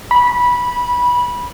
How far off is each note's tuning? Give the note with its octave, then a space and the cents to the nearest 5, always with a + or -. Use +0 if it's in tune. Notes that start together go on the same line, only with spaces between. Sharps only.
B5 -15